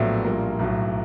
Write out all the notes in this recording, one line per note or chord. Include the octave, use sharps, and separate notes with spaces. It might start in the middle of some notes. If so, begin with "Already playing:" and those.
Already playing: A#1 A2 F#3 B3 E4
A#1 A#2 G3 A#3
B1 A2 F#3